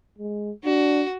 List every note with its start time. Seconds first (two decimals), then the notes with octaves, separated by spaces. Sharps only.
0.18 G#3
0.65 D4 F#4